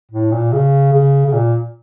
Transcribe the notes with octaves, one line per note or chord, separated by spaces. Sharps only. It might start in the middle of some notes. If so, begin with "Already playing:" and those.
A2
A#2
C#3
C#3
C#3
A#2